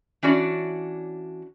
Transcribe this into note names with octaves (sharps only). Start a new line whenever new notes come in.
E3 C#4 D4 F#4 D5